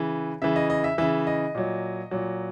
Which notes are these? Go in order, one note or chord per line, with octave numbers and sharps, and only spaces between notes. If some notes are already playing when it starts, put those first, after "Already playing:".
Already playing: C#3 E3 B4
C#3 E3 E5
D#5
D#5
E5
C#3 E3 E5
D#5
A#2 F#3
A#2 F#3